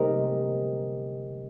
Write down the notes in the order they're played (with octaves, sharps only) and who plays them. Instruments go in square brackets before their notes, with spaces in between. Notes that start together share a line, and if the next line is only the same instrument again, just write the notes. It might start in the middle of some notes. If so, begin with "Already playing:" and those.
Already playing: [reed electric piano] C3 G3 A#3 D#4 G4 A#4 C5 D#5